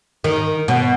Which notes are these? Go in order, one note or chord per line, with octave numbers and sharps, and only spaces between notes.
D#3
B2